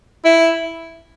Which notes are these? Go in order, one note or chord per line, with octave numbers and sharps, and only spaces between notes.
E4